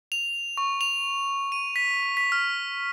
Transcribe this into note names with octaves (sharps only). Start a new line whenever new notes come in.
F7
C#6
F7
D#7
B6
B6
F6